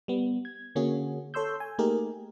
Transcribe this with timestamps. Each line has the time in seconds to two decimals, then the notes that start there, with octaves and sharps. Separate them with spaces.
0.08 G3 B3
0.45 G#6
0.75 D3 A#3 C#4 F#4 G#4
1.34 A4 C#5 C6 E6 G6
1.60 G#5
1.78 A3 A#3 D#4 G4 G#4 A#4